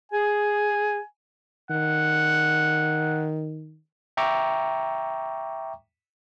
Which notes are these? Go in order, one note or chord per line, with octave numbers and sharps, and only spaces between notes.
G#4 G#5
D#3 F#5
E5 G5 A#5 C#6 D6